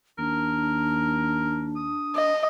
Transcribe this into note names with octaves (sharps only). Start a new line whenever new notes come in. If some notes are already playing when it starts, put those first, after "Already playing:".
D#2 D4 A#4
D#6
D#5